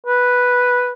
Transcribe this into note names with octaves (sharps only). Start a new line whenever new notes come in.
B4